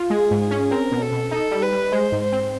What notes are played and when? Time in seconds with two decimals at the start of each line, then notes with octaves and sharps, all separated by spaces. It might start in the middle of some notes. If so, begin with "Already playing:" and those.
Already playing: F4
0.10 G#3 G#4
0.31 G#2
0.40 G#4
0.51 C#4
0.71 C4 A#4
0.92 B2
1.02 A4
1.12 B2
1.31 D#4 A4
1.51 G3
1.62 B4
1.72 G3
1.92 G#3 C5
2.12 G#2
2.21 C5
2.32 C4